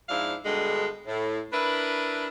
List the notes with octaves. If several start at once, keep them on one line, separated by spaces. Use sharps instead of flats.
G#2 F3 D4 E4 F5
G2 B2 D3 G#3
A2
D4 E4 A#4 B4